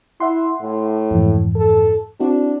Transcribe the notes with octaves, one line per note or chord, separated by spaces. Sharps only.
E4 E5 F#5 C6
A2
F2 G#2 E3
A4
C4 D4 E4 F#4